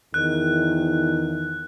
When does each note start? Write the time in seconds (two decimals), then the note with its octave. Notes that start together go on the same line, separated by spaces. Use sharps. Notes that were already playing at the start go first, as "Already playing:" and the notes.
0.14 E2 D#3 F#6